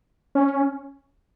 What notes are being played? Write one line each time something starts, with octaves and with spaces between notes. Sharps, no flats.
C#4